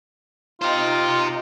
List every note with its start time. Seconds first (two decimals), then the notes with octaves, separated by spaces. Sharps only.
0.62 D#4 F4 G4 C5